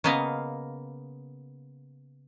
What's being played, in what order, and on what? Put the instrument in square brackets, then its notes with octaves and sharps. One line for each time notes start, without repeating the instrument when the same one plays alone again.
[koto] C#3 A#3 B3 D#5 F5